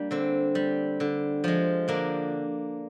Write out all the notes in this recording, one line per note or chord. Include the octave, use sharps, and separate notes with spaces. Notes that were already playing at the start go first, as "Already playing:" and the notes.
Already playing: G3 A#3 D4
D3 C4
G3
D3
F3 G#3
D3 A#3 D4